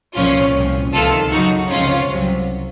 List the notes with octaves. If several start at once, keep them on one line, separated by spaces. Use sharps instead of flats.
C2 A#2 F3 C#4 F4
C2 A#2 F3
C#2 C3 D#3 F4 A4
F#2 C#3 F#3 D#4 F#4
C#2 C3 F3 C#4 F4
C2 C3 F#3